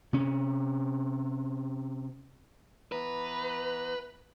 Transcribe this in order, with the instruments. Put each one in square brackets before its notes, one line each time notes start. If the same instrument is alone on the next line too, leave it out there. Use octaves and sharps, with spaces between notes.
[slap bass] C3 C#4
[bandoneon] E3 B3 A#5 [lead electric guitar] B4